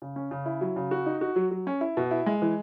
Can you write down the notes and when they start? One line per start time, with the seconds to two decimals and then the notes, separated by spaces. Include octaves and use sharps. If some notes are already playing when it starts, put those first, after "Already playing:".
0.02 C#3
0.16 C#4
0.31 C#3
0.46 E4
0.61 F#3
0.76 C#3
0.91 F#4
1.06 D#4
1.21 F#4
1.36 F#3
1.51 F#3
1.67 C#4
1.81 E4
1.97 B2
2.11 E4
2.26 G#3
2.42 E3